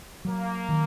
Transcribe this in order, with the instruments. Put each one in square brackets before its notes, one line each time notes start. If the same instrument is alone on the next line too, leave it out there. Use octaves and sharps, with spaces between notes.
[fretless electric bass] F#3 [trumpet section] A#3
[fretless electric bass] D#3